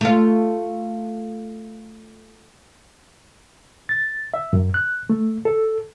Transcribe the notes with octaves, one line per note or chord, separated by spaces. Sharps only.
A3 F4
A6
E5
F#2
F#6
A3
A4